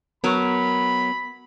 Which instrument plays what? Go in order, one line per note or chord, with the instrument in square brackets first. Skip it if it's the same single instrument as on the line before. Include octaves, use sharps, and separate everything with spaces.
[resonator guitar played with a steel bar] F#3 A#4 [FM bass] B3 [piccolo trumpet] B5